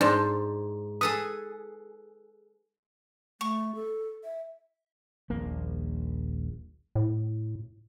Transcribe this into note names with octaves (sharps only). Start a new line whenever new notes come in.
G#2 D4 C5 A5
G#4 A4 B4 D#6
A3 C#6
A4
E5
D#1 A#1 A#3
A2